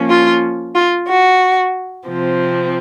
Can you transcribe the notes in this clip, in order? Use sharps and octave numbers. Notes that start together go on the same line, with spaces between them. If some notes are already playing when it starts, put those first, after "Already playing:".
Already playing: F3 A#3 C#4
F4
F4
F#4
C3 F3 C4